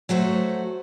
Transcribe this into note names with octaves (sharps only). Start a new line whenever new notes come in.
F#3 A3 F#4 C5